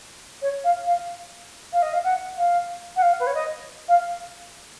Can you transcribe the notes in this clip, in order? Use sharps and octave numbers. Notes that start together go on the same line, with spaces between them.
C#5
F5
F5
F5
D#5
F5
F#5
F5
F#5
F5
B4
C#5
D#5
F5